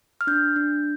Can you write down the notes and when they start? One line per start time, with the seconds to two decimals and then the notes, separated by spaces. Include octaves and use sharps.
0.21 F6
0.27 D4 G6
0.56 D4